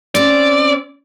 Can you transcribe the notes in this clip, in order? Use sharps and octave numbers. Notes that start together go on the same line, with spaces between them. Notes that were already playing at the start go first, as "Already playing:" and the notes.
C4 C#4 D5